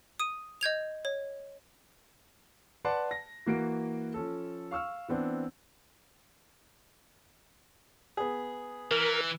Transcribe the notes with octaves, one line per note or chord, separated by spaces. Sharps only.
D#6 D#7
D#5 G6 G#6 F7
C#5
B4 D5 F#5 A5 C6 D6
A#6
E3 A#3 F#4 D7
F3 C#4 A4
F5 C#6 E6 F6
E3 B3 C4 D4
B3 G#4
E3 A#4